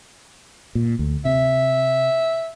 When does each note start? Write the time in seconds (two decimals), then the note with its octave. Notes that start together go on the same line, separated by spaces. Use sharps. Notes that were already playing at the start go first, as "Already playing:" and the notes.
0.75 A#2
0.99 D2
1.25 C3 E5